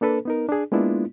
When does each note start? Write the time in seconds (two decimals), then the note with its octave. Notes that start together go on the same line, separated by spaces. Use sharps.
0.01 A#3 D4 A4 B4
0.25 B3 D#4 A#4
0.49 D4 G#4
0.72 G#3 A#3 B3 D4 E4 F4